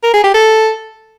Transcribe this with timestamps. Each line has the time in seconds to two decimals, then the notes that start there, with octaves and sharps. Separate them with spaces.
0.03 A#4
0.14 G#4
0.24 G4
0.34 A4